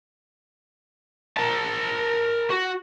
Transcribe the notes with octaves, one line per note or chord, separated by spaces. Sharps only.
A#4 A5
F#4